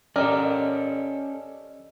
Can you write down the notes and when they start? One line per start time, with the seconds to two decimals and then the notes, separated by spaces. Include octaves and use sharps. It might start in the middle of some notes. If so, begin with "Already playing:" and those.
0.16 C#4 G4 A4 A#4 D5 D#5